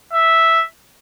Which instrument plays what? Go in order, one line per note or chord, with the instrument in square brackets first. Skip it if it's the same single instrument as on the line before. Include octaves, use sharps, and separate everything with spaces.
[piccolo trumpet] E5